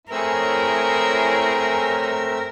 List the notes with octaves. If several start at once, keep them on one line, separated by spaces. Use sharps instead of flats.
A3 C4 E4 G#4 A#4 C#5 E6